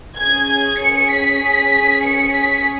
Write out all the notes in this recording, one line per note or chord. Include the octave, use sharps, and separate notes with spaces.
C#4 G#4 G#6
G#6
C#7
B6
C#7
B6